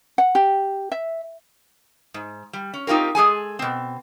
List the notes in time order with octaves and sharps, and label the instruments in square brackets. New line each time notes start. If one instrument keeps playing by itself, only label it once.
[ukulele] F#5
G4
E5
[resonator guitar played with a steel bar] G#2
G3
C#4
C4 D#4 F4 G4 A#4
G#3 G#4 A4 G#5
B2 C4